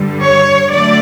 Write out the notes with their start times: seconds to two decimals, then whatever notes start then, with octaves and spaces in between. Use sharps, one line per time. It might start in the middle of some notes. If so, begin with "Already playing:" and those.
Already playing: G2 D3 G3
0.20 C#5
0.70 D3 F#3 A3 D5